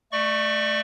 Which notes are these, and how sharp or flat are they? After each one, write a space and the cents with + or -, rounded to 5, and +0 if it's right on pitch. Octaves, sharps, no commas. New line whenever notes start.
A3 -10 D5 +25 C#6 +0